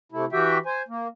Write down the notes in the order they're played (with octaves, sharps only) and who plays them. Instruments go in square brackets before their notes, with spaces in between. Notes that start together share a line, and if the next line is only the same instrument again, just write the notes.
[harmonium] C3 A3 E4
E3 F#4 G4 E5 G5
C5 G#5
A#3